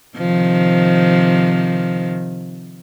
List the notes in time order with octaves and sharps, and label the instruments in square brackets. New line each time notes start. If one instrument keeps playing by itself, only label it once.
[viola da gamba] C3 D#3 F3